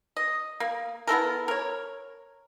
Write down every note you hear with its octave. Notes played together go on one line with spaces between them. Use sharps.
D#5
A#3
B3 E4 A4 A#4
A#4 C#5